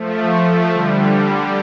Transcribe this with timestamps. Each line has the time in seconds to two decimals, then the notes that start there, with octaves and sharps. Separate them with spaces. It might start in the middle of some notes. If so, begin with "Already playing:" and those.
Already playing: F3 A3
0.73 D3 G3